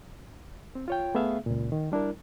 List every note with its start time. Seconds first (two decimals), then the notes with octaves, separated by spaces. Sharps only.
0.75 C4
0.88 F4 C#5 G5
1.15 A3 B3 G#4 E5 F5
1.46 C#2 A#2
1.72 D#3
1.92 G3 D4 E4 A#4